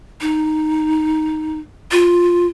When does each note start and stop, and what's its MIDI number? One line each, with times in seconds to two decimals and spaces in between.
0.21 1.59 63
1.92 2.46 65